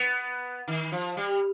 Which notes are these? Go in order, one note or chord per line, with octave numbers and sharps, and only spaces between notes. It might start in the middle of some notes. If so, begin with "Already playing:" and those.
Already playing: B3
D#3
F3
G3